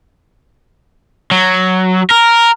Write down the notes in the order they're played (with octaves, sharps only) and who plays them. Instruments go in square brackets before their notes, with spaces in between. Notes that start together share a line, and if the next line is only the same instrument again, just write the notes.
[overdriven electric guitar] F#3
A#4